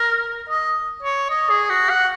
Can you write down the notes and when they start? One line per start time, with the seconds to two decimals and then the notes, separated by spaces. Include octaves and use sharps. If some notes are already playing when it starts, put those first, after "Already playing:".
Already playing: A#4
0.49 D#5
1.03 C#5
1.30 D#5
1.50 G#4
1.70 F#4
1.90 F#5